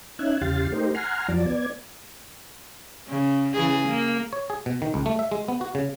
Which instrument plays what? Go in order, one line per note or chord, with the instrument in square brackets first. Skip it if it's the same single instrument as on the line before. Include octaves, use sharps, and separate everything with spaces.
[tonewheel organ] C#4 D#4 E5 F#6 G#6
E2 C#3 G4 F5 C6 A6
A3 D#4 G4 A#4 C5
F#5 G#5 A#5 C6 F6
F2 F3 F#3 D5 A5
B3 D5 G#6
[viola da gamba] C#3
C#3 E3 G#4
A#3
[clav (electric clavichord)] C#5
G#4
B2
D#3
C#2
A3
E5
G#3
B3
F#4
C#3